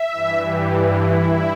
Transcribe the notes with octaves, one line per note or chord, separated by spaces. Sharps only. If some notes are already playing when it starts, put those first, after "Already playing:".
Already playing: E5
G2 E3
G4
E4